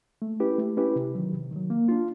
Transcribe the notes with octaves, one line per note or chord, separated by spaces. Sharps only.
A3
C#4 E4 G4 B4
A3
C#4 E4 G4 B4
C3
D#3 F#3
C3
D#3 F#3
A#3
D4 F4